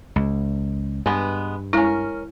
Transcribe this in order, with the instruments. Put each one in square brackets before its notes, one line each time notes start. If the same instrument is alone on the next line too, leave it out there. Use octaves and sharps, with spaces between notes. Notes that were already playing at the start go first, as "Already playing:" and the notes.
[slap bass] C#2
[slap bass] G2 [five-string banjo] G#3 B3
[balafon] G#3 E4 [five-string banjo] C#4 A#4